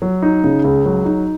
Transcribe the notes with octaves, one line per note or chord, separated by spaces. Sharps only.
F#3
D#4
C#3
C#2
F#3
D#4